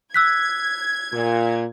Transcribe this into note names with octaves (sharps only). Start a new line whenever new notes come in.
E6 F#6 G#6 B6
A#2